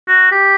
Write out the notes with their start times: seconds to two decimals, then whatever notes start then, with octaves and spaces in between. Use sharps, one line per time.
0.08 F#4
0.32 G4